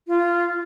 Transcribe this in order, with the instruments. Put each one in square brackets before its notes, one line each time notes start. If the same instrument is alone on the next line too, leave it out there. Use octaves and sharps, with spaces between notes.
[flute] F4